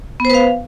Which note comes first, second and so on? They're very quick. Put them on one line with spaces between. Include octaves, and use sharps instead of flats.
B3 C5 B4 F5